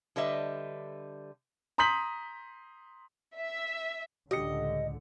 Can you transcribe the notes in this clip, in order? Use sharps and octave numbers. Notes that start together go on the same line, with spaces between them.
D3 G3 B4 D#5 E5
A#5 C6 D#6 G6 B6 F#7
E5
C#2 A2 D3 G4 D#5 C#7